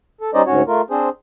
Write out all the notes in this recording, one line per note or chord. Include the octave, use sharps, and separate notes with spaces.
A4
G3 C#4 D#4 C5 D5 D#5
D2 G#2 C#4 F#4 C#5
A3 F4 A#4
C4 D4 G#4 C5